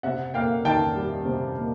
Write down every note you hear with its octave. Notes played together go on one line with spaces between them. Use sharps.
C3 E5 F#5
A#3 F5 G5
D#3 G5 A5
G3
C3
A#3